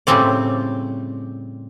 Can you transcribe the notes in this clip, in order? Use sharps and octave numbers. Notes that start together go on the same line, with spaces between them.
A2 C#3 G3 C4 D5